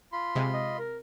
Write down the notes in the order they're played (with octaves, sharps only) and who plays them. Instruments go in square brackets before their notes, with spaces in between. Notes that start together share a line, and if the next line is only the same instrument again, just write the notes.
[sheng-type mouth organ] F4 B5 C6
[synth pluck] C3 G#3
[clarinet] D#5
A#4